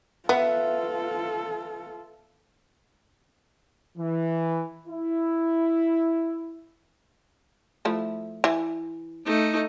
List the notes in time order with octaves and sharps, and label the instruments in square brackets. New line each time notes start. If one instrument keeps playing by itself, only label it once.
[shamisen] B3 [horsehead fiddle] F4 A4 [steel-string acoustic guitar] B4 E5 F#5
[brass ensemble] E3
E4
[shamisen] F3 A3 E4
E3
[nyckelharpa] A3 D#4